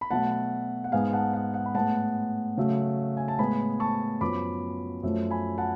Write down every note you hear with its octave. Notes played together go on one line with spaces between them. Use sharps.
B5
B2 F#3 A3 F#5 A5
F#5
G#2 G#3 B3 F5 G#5
F#5 A5
F#5
F#5
B5
A2 G#3 B3 F#5 A5
C#3 F#3 A3
G#5
A5
A2 G#3 B3 G#5 B5
A5 C#6
F#2 F3 B3 B5 D6
F#2 F3 A3
G#5 B5
F#5 A5